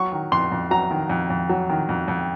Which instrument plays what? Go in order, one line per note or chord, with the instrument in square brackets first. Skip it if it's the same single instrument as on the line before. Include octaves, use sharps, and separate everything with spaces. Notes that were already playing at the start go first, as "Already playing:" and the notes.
Already playing: [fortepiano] F#3 C#6
D#3
F2 C6
F2
F#3 A#5
D#3
F2
F2
F#3
D#3
F2
F2